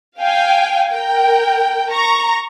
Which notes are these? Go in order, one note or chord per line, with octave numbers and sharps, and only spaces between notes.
F5 G5 G#5
A#4 G5
A#5 C#6